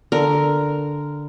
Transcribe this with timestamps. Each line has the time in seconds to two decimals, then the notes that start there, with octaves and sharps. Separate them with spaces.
0.12 D3 A#4